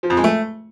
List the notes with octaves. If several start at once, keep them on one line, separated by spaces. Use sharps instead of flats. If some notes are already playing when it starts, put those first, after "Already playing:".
F3
F2
G#3
A3